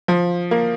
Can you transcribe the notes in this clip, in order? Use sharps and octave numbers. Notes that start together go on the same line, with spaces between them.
F3
A#3